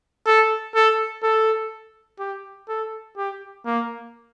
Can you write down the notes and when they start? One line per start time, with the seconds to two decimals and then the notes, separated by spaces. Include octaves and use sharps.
0.26 A4
0.75 A4
1.23 A4
2.19 G4
2.69 A4
3.17 G4
3.65 A#3